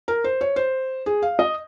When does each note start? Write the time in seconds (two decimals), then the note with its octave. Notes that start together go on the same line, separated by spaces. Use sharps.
0.08 A#4
0.24 C5
0.41 C#5
0.56 C5
1.06 G#4
1.22 F5
1.39 D#5